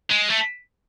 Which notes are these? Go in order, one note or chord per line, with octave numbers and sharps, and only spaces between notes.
G#3
A3